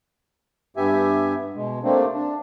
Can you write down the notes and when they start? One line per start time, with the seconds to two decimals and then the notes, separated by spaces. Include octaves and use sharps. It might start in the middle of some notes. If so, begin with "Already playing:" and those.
0.77 G2 B3 G4 E5 G#5
1.55 B2 G#3
1.83 C3 A3 A#3 C4 D4
2.14 D4